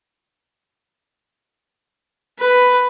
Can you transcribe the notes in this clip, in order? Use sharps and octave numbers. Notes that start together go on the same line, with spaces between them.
B4